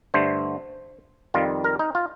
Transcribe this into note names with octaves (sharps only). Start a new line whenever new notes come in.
G2 D3 A3 C5
F2 D#3 G3 F4
A#4
D#4
F4